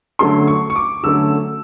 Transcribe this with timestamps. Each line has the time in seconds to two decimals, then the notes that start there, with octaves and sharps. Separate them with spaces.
0.19 D3 F#3 A3 C#4 C6
0.47 C#6
0.70 C#6
0.76 D6
1.03 D3 F#3 A3 C#4 E6